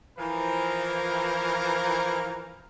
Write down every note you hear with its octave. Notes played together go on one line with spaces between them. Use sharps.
E3 F3 A#4